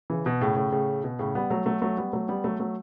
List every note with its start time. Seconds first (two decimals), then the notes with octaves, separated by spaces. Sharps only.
0.10 C#3 E3
0.26 B2
0.41 A2 C#3
0.56 A2 C#3
0.72 A2 C#3
1.04 B2
1.19 A2 C#3
1.35 G3 B3
1.50 F#3 A3
1.66 F#3 A3
1.82 F#3 A3
1.97 G3 B3
2.13 F#3 A3
2.28 G3 B3
2.44 F#3 A3
2.60 F#3 A3